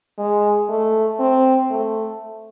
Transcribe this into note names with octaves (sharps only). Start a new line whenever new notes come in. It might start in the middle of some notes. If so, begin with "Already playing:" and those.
G#3
A3
C4
A3